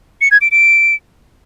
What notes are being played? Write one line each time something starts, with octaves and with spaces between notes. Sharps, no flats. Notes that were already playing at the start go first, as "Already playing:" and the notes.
C#7
G#6
D7
D7